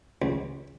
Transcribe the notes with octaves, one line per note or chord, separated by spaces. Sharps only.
C#2